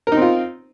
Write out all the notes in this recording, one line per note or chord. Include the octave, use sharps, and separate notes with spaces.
C4 D#4 F4 A#4